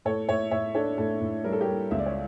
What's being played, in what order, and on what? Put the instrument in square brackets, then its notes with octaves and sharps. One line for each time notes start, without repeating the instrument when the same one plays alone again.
[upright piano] A2 A4 C#5
A2 C#5 E5
A2 C#5 E5
D4 A4 C#5
A2 A4
A2
G3 A#4
A4
G4 A#4
G3
C#2 E5
D5
C#5